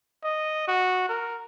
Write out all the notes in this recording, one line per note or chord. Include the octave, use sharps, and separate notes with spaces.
D#5
F#4
A#4